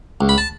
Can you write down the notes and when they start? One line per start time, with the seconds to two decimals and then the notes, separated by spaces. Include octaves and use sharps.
0.21 C#2
0.29 B5
0.38 A5